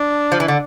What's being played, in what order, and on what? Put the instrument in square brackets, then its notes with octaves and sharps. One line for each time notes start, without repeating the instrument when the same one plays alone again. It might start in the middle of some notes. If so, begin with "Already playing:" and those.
Already playing: [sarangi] D4
[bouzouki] F3
E3
D3